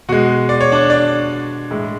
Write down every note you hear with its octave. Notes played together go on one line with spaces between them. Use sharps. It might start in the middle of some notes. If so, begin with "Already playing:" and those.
B2 G#3 F#4
D5
C#5
D4 D5
D4 D5
A2 G#3